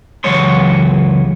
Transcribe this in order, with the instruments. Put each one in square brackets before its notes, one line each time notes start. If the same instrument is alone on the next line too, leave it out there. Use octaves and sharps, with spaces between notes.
[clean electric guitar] C#2 E3 F#3 G#3 C#5 C6